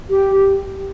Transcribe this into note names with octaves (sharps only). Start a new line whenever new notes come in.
G4